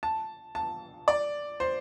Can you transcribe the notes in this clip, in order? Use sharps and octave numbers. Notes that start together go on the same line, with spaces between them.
A5
A5
D5
C5